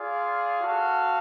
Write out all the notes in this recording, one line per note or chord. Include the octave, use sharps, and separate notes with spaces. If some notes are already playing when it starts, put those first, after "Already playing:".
Already playing: F4 G#4 D5 F5
F#4 A4 F5